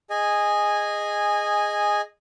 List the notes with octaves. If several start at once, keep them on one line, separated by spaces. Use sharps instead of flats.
G#4 D#5 G#5